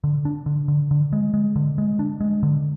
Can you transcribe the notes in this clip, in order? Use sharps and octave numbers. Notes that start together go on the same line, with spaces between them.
D3
D4
D3
D3
D3
G#3
G#3
D3
G#3
D4
G#3
D3